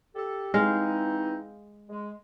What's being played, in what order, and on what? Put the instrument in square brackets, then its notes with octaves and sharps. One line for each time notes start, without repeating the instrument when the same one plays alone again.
[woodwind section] G4 A4
[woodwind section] E3 C4 D#4 [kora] G#3 F5
[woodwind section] G#3